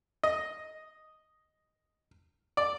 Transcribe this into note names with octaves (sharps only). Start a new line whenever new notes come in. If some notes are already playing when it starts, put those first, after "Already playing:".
D#5
D5